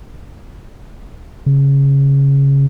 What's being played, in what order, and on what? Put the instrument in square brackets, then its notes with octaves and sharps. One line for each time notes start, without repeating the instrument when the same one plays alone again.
[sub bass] C#3